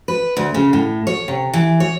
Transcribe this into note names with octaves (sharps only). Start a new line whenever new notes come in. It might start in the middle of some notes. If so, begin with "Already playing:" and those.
B4
D2
C#3
A2
C#5
C3
E3
C#5